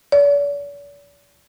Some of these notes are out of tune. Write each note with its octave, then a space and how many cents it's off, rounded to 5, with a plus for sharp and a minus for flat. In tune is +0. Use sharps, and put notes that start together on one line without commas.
D5 -45